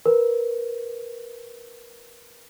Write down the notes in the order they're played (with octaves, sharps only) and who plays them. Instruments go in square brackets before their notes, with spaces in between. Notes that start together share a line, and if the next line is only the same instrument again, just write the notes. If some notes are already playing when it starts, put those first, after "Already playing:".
[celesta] A#4 B4